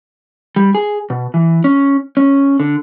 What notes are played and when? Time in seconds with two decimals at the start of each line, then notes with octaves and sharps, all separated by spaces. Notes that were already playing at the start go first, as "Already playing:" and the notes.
0.56 G3
0.75 G#4
1.10 B2
1.34 E3
1.64 C#4
2.17 C#4
2.60 D3